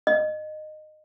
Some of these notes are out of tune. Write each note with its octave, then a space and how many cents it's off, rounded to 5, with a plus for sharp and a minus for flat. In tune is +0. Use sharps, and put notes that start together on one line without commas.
D#5 -20